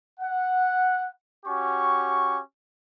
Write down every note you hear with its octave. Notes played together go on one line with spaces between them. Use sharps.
F#5
C#4 F#4 G4 C#6